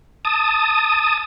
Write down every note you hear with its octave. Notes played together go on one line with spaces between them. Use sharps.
A5 D#6